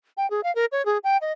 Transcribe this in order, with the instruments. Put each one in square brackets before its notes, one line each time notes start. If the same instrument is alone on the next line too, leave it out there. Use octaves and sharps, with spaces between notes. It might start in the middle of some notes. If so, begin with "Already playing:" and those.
[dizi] G5
G#4
F5
A#4
C#5
G#4
G5
D#5